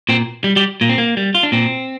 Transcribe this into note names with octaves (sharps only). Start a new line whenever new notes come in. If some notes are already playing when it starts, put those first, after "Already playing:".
A#2 C4
G3
G3 G4
A#2 A#3
C4
A#3
G3
F4
D4
A#2 C4